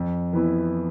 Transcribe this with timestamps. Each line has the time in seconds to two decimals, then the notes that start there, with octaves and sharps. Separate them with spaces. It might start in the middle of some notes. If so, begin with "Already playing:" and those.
Already playing: F2
0.33 E3 B3 E4